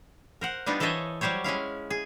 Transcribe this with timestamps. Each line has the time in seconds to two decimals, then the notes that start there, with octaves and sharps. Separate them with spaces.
0.41 A#4 C5 F#5
0.66 G3 B3 D4 D#4 F4
0.80 E3 A4 C5 C#5 D#5 E5
1.21 F#3 G3 G4 C5 C#5
1.44 G#3 C#4 E4 F5
1.90 G#4